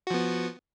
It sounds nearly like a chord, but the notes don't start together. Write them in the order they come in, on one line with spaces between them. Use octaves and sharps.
F#4 F3 B3